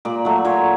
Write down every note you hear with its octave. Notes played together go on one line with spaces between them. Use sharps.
A#2 D5
F#3 A3
A#2 C#5